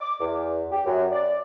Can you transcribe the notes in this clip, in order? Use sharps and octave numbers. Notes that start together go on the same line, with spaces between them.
D6
E2
G4
F#2
D5